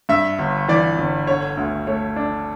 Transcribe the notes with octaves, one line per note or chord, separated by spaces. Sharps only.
G2 E5
G1
E3 D5
G1
D3 C#5
D2
A3 C#5
D4